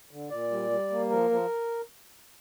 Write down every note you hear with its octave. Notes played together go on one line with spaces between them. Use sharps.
D3
A#2 D5
G3
G3
A#3
F3 A#4
F3